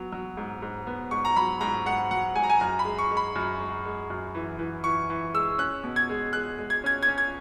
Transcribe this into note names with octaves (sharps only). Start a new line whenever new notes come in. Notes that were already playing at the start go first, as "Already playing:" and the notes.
Already playing: F#3 B3
F#3
G#2
G#2
B3
G#2 C#6
A#5
F#3 B5
G#2 A#5
G#2 F#5
F#3 F#5
G#2 G#5
A#5
G#5
F#2 A#5
B5
G#3
C#6
G#3
B5
F#2
G#3
G#3
F#2
E3
E3
E3 C#6
E3
G#3 E6
C#4 F#6
B2
G#6
G#3
G#3 F#6
G#3
G#6
C#4 G#6
G#6
C#4
G#6